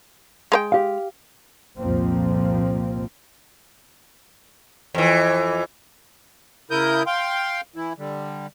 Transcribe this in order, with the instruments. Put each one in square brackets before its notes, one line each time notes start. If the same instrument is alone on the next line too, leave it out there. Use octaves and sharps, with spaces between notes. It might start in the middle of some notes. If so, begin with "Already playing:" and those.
[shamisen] G#3 B4 G5
[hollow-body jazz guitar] G4 F5
[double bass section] C2 F2 A#2 F3 A#3 C4
[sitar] F2 E3
[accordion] C#3 E4 A#4 D#6 G6
F5 G5 C6
E3 E4
D3 G3